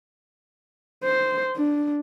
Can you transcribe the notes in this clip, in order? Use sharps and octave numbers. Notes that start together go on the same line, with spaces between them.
C5
D4